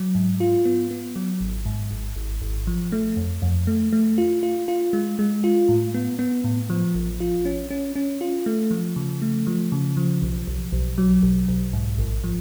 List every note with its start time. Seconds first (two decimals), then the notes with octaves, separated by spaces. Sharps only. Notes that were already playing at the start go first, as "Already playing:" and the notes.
Already playing: F#3
0.15 G#2
0.40 F4
0.65 B3
0.91 B3
1.16 F#3
1.41 G#1
1.66 G#2
1.91 G#1
2.16 G#1
2.42 G#1
2.67 F3
2.92 A3
3.17 F2
3.42 F2
3.67 A3
3.93 A3
4.18 F4
4.43 F4
4.68 F4
4.93 G#3
5.19 G#3
5.44 F4
5.69 A2
5.94 B3
6.19 B3
6.44 A2
6.70 F3
6.95 A1
7.20 F4
7.45 C#4
7.70 C#4
7.96 C#4
8.21 F4
8.46 A3
8.71 F3
8.96 C#3
9.22 A3
9.47 F3
9.72 C#3
9.97 F3
10.22 B1
10.47 B1
10.73 B1
10.98 F#3
11.23 B1
11.48 B1
11.73 G#2
11.98 A1
12.24 F3